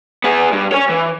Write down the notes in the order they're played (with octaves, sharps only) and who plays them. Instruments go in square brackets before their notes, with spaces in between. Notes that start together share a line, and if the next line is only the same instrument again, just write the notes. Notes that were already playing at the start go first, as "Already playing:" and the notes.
[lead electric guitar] B3 G#4
G2
C#5 G#5
E3